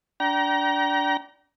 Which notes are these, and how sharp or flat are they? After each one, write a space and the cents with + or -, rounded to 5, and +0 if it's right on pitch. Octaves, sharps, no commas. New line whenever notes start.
D4 -15 G5 -30 A#5 +25